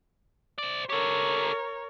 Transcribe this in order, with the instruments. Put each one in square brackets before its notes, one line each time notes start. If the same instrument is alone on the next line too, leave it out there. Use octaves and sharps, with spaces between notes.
[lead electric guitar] C5 D5
[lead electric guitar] G4 A4 [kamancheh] A#4 C#5